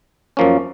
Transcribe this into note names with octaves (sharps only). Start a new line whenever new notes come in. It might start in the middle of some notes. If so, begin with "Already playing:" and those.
F#2 F3 A#3 C#4